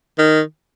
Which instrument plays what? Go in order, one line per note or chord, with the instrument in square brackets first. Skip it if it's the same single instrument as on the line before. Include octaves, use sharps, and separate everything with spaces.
[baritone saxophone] D#3